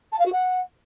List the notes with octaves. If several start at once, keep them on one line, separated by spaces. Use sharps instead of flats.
A5
F5
F#4
F#5